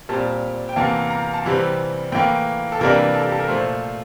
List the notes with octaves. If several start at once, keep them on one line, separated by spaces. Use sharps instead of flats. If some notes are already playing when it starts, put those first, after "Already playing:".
A#2 G3 C4 A5
G5
E2 C3 E3 A#3 A5
A#5
A5
C3 E3 G3 C4
A2 E3 A#3 G5
A4
C3 E3 G3 A#3 D4 A#4
A4
G4
A4
A#4
A#2 F3 A3 C5